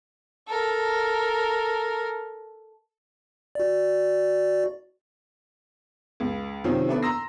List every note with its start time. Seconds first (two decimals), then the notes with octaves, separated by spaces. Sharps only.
0.48 A4 A#4
3.55 F#4 D5
6.20 C#2
6.64 C3 D#3 F3 F#3 C4 C#4
6.89 A3 B3 D4 B4
7.03 A#5 C6 E6 A#6